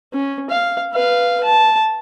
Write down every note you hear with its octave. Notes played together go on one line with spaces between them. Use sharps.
C#4
F5
B4 F5
A5